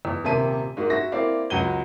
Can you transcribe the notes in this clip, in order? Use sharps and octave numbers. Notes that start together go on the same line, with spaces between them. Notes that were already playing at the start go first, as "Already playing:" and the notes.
E2
D#1 C3 A#3 E5 A5 D#7
G#2 A#3 F#4
F#4 E5 A#6
A#3 C4 E4 D5 F5
C#2 F#3 F#5 D#7 G7